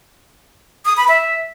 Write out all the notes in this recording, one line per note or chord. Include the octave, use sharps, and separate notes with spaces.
D#6
B5
E5